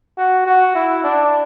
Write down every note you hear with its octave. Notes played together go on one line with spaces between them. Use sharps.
F#4
F#4
E4
D4